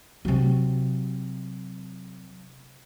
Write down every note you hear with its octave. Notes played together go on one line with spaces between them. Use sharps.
C3 F#3